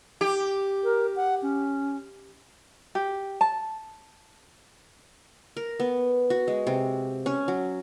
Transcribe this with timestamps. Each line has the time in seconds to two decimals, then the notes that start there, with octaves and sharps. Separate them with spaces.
0.21 G4
0.84 A#4
1.16 F#5
1.42 C#4
2.95 G4
3.41 A5
5.57 A#4
5.80 B3
6.30 F#4
6.48 G#3
6.67 C3
7.26 C#4
7.48 F#3